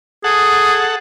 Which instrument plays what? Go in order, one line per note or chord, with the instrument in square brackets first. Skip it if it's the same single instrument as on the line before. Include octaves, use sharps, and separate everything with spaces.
[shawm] G#4 [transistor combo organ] A4 F#5